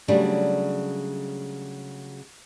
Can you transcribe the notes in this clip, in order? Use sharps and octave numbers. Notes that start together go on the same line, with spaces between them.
C#3 F#3 G3 A3 D4